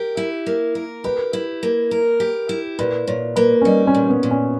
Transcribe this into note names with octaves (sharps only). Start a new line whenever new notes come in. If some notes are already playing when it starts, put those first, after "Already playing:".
Already playing: G4 A#4
E4
A#3
A#4
G4 B4
E4
A#3
A#4
G4
E4
A#2 B4
A#2 C#5
A#3 B4
C#4
G3 D#4
C#4
A#2
B3
A#2
C#4